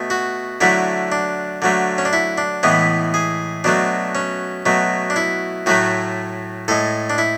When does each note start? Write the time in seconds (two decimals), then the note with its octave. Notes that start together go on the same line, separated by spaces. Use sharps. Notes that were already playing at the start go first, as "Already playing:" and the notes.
Already playing: B2 A3
0.10 F#4
0.61 D3 F#3 A3 E4
1.12 D4
1.62 D3 F#3 A3
1.98 C#4
2.05 D4
2.13 E4
2.38 D4
2.63 A2 E3 G#3 B3
3.14 G#4
3.64 B2 F#3 A3 D4
4.15 C#4
4.66 B2 F#3 A3
5.10 D4
5.16 E4
5.66 A2 F#3 A3 F#4
6.68 A2 G#3 A4
7.10 D4
7.18 E4